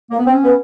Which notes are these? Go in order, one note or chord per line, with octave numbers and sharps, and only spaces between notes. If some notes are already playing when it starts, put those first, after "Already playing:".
A#3
B3
C4
C#4
B3